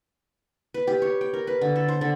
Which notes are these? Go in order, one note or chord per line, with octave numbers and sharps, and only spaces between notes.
B4
G4
C#5
G5
A#4
B4
D3
A4
C5
D3